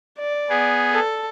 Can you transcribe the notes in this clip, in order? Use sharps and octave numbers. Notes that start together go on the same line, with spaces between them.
D5
B3 G#4
A4